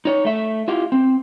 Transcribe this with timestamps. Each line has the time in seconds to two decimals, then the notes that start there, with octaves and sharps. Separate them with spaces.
0.05 D#4 C#5
0.25 A3 E5
0.68 E4 F4 G4
0.92 C4